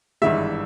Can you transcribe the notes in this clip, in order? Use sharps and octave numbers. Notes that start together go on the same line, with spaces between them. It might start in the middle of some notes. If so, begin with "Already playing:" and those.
G#1 G2 E3 G#3 E5